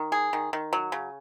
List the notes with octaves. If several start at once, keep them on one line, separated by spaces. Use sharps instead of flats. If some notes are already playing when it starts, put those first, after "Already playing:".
Already playing: D#3
G#4
D#3
D#3
F#3
C#3